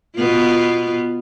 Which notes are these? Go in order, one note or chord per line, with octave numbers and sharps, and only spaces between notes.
B2 B3 F4